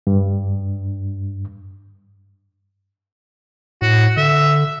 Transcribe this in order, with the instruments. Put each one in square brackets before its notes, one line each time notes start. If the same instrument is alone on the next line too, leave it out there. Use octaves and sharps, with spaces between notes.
[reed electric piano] G2
[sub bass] A2 [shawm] F#4
[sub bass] D3 [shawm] E5